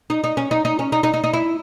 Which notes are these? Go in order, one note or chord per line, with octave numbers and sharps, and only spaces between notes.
D#4
D#4
C#4
D#4
D#4
C#4
D#4
D#4
D#4
D#4
E4